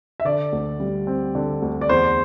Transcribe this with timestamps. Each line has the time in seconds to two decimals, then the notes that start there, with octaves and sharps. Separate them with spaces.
0.20 E5
0.25 D3 D5
0.52 D2
0.80 G3
1.07 C4
1.35 D3
1.62 D2
1.81 D5
1.89 E2 C5